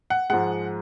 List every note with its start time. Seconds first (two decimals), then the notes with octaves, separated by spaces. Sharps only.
0.10 F#5
0.30 G#2 F3 G#3 F#5